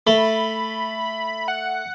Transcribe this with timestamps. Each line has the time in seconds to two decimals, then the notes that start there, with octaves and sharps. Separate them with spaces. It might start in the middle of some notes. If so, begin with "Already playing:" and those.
0.07 A3 B5
1.48 F#5